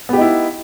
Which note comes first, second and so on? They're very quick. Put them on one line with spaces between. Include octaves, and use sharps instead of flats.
B3 G4 D#4 E4